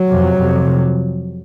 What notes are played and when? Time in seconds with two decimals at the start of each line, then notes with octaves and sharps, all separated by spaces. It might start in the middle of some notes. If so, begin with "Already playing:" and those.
Already playing: F#3
0.08 F2 C3
0.39 F2 C3